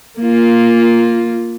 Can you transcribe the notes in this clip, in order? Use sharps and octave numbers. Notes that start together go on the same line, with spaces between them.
A#3 F4